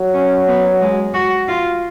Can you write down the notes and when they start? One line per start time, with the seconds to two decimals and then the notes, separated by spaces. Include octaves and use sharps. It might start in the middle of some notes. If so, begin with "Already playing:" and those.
Already playing: F#3
0.14 C#4
0.48 B3
0.81 G#3
1.14 F#4
1.48 F4